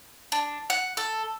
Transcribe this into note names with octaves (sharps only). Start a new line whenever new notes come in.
D4
F#5
A4